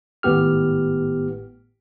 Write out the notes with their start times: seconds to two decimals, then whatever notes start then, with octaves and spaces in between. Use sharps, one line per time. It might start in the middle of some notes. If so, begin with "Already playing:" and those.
0.23 G#1 A2 B3 G4 F6